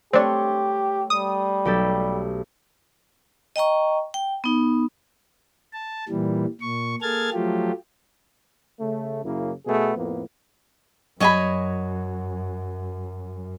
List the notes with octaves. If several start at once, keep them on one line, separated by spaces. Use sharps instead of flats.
A3 C4 D4 G4 C#5 C6
G3 D#6
B1 G4 A4
D#5 G5 A#5 C#6
G5
B3 D#4
A5
A#2 E3 G3
A#2 C#6
A#3 G#4 A4 F6 G#6 A6
F3 F#3 A3 F4 G4
C#3 A3
F#2 C#3 A#3 E4
B2 A3 B3 G#4
F2 A2 A#3 B3
F#2 F#3 C#5 D#5 G#5 B5